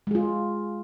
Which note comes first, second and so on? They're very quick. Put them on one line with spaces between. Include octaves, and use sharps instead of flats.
G#3 G#4 F4